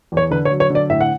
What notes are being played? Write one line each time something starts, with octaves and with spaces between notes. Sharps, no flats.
E2
C#5
D3 B4
C#5
F#3
C#5
D3
D5
A2 E5
F#5